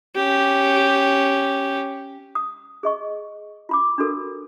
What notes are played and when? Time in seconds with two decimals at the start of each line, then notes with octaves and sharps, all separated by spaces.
0.16 C#4 G4
2.35 D#6
2.83 G#4 D#5 C#6
3.69 F4 B5 D6
3.98 D4 F#4 A4 A#4